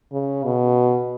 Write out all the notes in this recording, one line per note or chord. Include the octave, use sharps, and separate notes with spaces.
C#3
B2